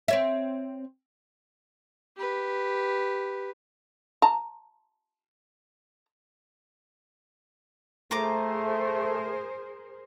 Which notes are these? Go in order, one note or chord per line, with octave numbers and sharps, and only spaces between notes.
C4 C#5 E5
G4 B4
A5 A#5
A3 F4 G#4 A#4 C5 A#5 D6